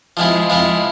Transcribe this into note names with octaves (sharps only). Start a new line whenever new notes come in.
F3 G#3 C4 E4
F3 G#3 C4 E4